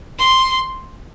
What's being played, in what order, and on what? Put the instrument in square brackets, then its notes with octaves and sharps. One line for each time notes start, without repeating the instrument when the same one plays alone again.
[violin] C6